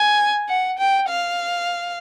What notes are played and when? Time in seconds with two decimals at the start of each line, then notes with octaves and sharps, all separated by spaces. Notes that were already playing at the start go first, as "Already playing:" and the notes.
Already playing: G#5
0.49 F#5
0.78 G5
1.08 F5